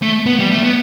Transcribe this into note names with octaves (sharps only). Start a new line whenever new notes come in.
A3
B3
G3
A3
B3